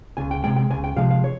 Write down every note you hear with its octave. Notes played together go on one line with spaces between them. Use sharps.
C#2 G#5
G5
C3 F3 G#3 G5
G5
C#2 G#5
G5
C3 F3 G#3 F5
F5
C#5